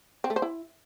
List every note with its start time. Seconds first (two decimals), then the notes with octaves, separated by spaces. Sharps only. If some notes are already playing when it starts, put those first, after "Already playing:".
0.24 C4
0.30 A3
0.36 C5
0.42 E4